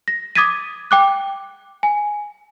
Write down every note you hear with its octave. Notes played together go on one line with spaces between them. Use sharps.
A#6
D6 D#6 G#6 A6 B6 D#7
G5 D6 F#6
G#5